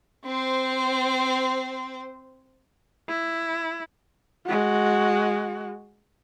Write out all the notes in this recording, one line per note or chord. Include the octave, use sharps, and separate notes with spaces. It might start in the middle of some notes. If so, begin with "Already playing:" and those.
C4 C5
E4
G#3 F#4